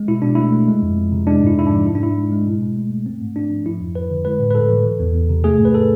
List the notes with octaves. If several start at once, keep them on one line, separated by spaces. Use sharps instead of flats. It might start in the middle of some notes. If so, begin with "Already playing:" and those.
Already playing: G#3
B2 E4
B2 D4
A3 E4
A3
G#3
F2
F2
C3
G#3 D4
G#2 E4
G#2 E4
D4
F3
G#2 E4
D4
G#2 E4
G#3
G#3
B2
B2
A3
A3
A3 C4
G#2
G#2 D4
F3
F3 E4
F2
F2 B4
D3
G#3 B4
A2
B4
A2 A4
E3
E3
E2
E2
C3
A3 G#4
G#2
B4
A4